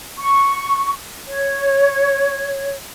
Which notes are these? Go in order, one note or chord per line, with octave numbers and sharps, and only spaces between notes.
C#6
C#5